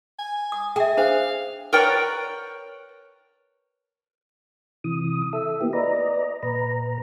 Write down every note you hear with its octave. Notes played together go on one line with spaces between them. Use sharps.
G#5
D#6
G#4 E5 G5
D4 C5 F5
A#4 B4 C#5 D5 G5
C3 E3 D#6
A4 E5
A#3 B3 E4 G4
B4 D5 D#5 A#5
A#2 B4 A#5